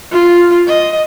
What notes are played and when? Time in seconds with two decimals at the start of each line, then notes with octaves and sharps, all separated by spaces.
0.11 F4
0.67 D#5